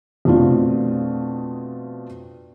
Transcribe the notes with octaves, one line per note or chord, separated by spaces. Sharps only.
F2 B2 A3 D4 F4